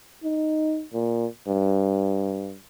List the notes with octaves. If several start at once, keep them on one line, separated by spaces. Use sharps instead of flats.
D#4
A#2
G2